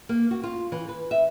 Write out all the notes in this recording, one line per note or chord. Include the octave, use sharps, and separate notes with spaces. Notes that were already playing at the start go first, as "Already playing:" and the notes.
A#3
F#4
F4
E3
B4
E5